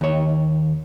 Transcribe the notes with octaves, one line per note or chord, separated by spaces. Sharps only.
D#2 C#5